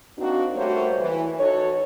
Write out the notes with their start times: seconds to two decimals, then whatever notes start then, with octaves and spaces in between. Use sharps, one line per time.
0.17 A#3 C4 D4 D#4 F#4
0.55 G3 A3 A#3 F#4 C5 C#5
1.00 E3
1.39 D#4 F#4 A4 C#5